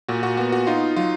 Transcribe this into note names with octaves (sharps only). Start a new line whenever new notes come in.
A#2 F#4
F#4
B3 F#4
F#4
D#4 F4
F#3 F4